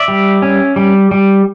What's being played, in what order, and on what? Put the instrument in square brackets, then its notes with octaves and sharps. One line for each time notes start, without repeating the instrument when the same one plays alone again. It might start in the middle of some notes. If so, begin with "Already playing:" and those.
Already playing: [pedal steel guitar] D5 E5
G3
C#4
G3
G3